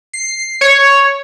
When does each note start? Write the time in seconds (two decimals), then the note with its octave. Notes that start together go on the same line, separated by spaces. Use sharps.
0.13 C7
0.61 C#5